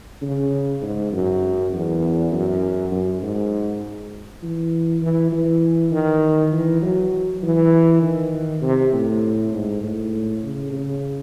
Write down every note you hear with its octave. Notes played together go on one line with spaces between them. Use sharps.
C#3
G#2
F#2
E2
F#2
F#2
G#2
E3
E3
E3
D#3
E3
F#3
E3
D#3
C3
A2
G#2
A2
C#3
C#3